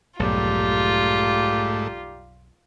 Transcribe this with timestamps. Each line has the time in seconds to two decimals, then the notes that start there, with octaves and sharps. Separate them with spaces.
0.20 B1 F2 G#2 G3 A3 D#4 F4 G4